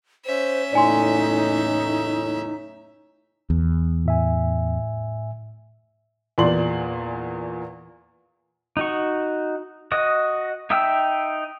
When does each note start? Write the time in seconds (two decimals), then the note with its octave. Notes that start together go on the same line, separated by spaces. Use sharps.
0.26 C#4 C5 E5
0.73 F#1 E2 A2 D#4 D5 G#5 C6
3.50 E2
4.06 A2 E5 G#5
6.38 E2 A#2 E3 D5 C6 F#7
8.77 D#4 F#4 C#6
9.92 F#4 D#5
10.70 D#4 E5 G5 E6